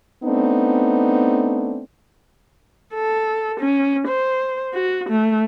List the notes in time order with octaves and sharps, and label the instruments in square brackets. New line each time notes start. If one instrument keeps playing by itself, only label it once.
[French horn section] A3 B3 C4 D4 D#4
[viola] A4
C#4
C5
F#4
A3